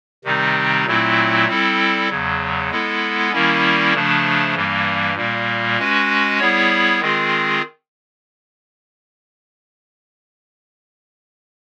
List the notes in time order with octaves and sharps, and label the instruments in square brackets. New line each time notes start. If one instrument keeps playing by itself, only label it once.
[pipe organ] C3 D#3 G3 C4 D#4
A#2 F#3 A3 C4 E4
G3 C4 E4 A4
E2 C#3 F#3
G#3 B3 E4 A4
D#3 G3 A#3 C#4 E4
C#3 F3 A3 D4
G2 E3 G3 A#3
A#2 G3 A#3
G#3 C#4 F#4 B4
G3 B3 E4 G#4 C#5
D#3 G#3 C4 F4 G#4